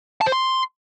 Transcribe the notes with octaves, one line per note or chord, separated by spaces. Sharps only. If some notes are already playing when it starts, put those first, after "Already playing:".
A5
C5
C6